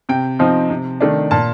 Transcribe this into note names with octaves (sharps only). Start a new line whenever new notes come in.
C3 G5
F3 C4 D#4
C3
D#3 A3 D4
A#2 A5